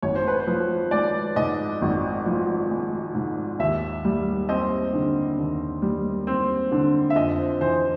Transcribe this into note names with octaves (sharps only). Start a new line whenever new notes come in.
G#1 C#5
C5
B4
C5
F3
G#3 D5
G#2 D#5
G#1
F3
G#3
G#2
D#2 E5
G3
C4 D#5
D3
D#2
G3
C4
D3
E5
F2 D#5
C5
E3 C5